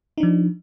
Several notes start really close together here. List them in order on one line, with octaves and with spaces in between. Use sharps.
D#4 D4 F3